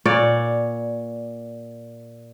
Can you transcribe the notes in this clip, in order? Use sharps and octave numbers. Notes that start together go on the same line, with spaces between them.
A#2 C#5 D5